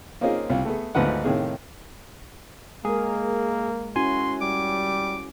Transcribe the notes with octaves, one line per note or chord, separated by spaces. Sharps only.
A#3 C4 C#4 D#4 F4 G#4
C2 F4
A3 B3 G#4
G#1 D2 F3 B4 F#5
A2 C3 D#3 A#3 G#4
G#3 A#3 G#4 A#4
C#4 E4 F#4 G#5 C6
G3 D6